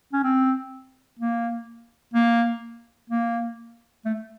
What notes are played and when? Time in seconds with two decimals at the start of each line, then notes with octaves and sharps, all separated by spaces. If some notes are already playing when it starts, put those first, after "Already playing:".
0.13 C#4
0.24 C4
1.19 A#3
2.14 A#3
3.10 A#3
4.05 A3